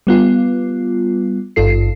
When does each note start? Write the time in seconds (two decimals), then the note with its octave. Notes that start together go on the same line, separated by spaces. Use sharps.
0.07 G3 B3 F4
1.56 G#1 G2 F4 A4 C7